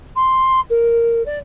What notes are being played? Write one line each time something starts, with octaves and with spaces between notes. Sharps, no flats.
C6
A#4
D5